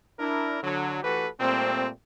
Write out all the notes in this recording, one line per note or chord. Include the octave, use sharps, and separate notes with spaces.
D4 E4 A#4
D3 F#3
E3 A3 F#4 G4 A4 B4
A#2 G3 A3 C4